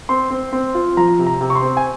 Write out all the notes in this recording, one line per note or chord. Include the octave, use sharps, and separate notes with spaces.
C4 C6
C4
C4
F4
F3 A#5
C3
A#5
C3
C#6
C6
C4
G#5